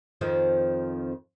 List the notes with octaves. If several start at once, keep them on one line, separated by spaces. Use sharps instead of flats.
F2 D#3 F3